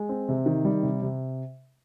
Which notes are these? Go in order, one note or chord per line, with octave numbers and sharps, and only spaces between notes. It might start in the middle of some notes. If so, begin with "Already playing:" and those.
Already playing: G#3
C4
C3
D#3
G3
C3
C3